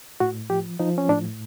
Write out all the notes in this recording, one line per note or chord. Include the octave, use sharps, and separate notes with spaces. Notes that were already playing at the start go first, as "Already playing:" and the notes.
A2 F#4
F3 G4
F3 D#4
C#4
A2 D4